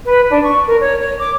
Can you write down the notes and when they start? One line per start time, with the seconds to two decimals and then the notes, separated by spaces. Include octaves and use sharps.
0.05 B4
0.30 D4
0.43 C#6
0.67 A#4
0.81 C#5
1.00 C#5
1.19 D6